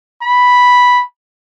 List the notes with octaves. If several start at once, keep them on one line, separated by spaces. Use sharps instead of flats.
B5